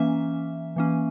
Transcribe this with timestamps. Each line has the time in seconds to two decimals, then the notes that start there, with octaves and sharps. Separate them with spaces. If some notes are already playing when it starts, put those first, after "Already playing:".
Already playing: E3 A#3 C#4 E5
0.76 E3 A#3 C#4